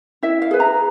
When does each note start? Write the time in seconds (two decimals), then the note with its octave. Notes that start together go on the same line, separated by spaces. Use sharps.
0.23 E4 E5
0.42 F5
0.51 G#4 B4
0.60 A#5